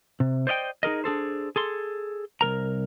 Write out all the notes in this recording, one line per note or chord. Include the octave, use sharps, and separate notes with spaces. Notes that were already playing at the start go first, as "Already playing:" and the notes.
C3
C5 D5 D#5 F5 G5
D#4 G#4 A#4 D#5
D4 G#4 A4 C5
G#4 A4 C6
C2 F#3 A#4 A#5